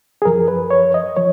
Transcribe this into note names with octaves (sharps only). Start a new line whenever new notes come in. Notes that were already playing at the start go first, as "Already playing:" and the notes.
G#4
F#2 F3 A#4
B4
C#5
D#5
F3 C#5